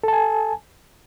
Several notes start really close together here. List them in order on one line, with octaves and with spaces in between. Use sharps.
A4 A5 G#5